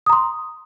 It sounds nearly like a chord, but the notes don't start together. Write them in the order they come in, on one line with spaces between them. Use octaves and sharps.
D#6 A#5 C6